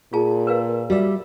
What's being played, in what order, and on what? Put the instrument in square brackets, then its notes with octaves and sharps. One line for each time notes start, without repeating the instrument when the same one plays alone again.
[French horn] A#2 [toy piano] F4 G#4 A5
[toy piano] A#4 B4 F5
[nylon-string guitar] G3 E5 [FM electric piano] F#4 D5